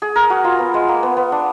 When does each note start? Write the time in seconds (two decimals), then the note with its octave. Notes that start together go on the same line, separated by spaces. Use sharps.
0.02 G#4
0.16 A#4
0.30 F#4
0.44 F4
0.59 B3
0.74 G#3
0.88 A#3
1.03 B3
1.17 B3
1.32 D4